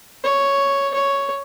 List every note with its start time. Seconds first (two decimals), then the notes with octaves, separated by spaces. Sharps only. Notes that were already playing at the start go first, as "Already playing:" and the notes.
0.24 C#5
0.94 C#5